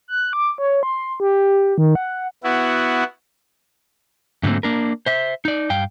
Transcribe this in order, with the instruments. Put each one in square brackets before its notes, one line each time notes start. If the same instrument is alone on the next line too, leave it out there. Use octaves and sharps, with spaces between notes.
[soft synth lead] F#6
D6
C#5
C6
G4
D#3
F#5
[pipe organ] B3 E4 F#4
[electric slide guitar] G#2 D3 F#3 A3 A#3 C4
A#3 D4 A#4
C5 E5
D#4 D5
G2 F5 G5